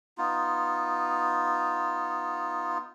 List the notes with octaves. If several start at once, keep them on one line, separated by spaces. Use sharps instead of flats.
B3 D#4 F4